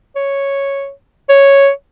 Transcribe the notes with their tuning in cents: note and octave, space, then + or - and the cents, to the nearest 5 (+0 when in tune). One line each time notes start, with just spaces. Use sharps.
C#5 -5
C#5 +0